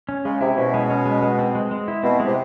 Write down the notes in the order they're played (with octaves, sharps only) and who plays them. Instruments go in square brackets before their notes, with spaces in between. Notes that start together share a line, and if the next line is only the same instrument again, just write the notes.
[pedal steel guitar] C#4
[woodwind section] C#3 [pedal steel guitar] G#3
[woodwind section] C3 [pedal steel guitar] E4
[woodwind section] B2 [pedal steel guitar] C#4
[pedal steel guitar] G#3
C#4
G#3
G#3
C4
G#3
G#3
E4
[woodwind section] B2 [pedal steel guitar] C4
[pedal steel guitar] G#3
[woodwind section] C3